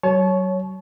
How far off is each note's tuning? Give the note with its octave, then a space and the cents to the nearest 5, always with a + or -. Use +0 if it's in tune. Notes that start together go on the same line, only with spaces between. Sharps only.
F#3 +30 C#5 +0 A5 -35